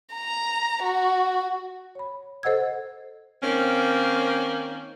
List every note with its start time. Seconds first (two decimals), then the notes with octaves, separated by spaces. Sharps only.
0.14 A#5
0.83 F#4
1.95 C#5 B5
2.43 A4 C5 D#5 F#5 E6 G#6
3.42 D#3 A#3 C4 C#4